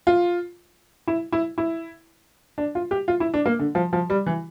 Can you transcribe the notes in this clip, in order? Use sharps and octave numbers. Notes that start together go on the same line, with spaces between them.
F4
E4
E4
E4
D4
F4
G4
F4
E4
D4
A#3
D3
F3
F3
G3
E3